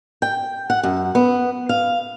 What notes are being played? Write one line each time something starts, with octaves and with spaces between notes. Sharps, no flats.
G5
F#5
F#2
B3
F5